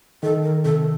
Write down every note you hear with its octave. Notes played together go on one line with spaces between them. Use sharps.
D#3 A4
A#4
C3 A4